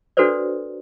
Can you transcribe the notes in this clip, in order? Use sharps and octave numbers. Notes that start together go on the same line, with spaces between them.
D4 F#4 A4 B4 C5 D5